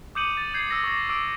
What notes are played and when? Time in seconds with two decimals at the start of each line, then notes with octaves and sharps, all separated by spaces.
0.15 D6 D#6 G6 C#7 D#7 F#7
0.37 A6
0.54 G6 G#6 C7
0.70 D#6 E6 A#6
0.84 C#6 D6 A#6
1.09 D6 E6 D7